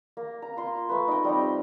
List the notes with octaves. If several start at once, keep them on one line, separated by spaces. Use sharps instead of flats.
A#3
A#5
F4 C6
A3 B4
D#4 G5
G3 C4 D#4